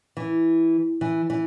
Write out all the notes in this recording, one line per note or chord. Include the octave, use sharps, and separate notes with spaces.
E3
E3
E3